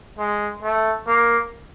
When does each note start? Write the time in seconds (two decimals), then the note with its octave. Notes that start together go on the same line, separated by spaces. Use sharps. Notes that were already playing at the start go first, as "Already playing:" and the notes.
0.18 G#3
0.62 A3
1.07 A#3